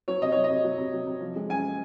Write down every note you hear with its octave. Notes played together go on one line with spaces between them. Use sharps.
F#3 C#5
C3 D#5
F#3 C#5
D#5
C3
F#3
C3
F#3
C3
F3
G#3
F#2 G#5